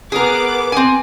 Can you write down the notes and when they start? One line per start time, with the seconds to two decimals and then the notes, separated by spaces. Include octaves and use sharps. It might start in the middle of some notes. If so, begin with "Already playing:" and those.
0.12 B3 G#4 A#4 D6
0.72 C4 G#5